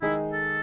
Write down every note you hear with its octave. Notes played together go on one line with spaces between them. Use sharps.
D#3 G#3 D#4 E4 G#4 D#5
A4